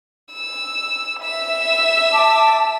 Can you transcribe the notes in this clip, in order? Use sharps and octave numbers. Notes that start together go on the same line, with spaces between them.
E6
E5 E6
A5 D6